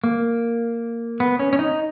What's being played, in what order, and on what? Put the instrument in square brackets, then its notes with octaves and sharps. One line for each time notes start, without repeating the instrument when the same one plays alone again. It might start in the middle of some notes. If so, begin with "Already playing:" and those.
[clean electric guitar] A#3
B3
C#4
C#4
D#4